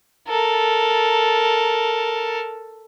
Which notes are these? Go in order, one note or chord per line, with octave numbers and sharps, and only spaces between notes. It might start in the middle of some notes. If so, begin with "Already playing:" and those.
A4 A#4